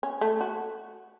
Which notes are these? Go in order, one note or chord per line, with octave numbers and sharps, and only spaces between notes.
C#4
A3
F#4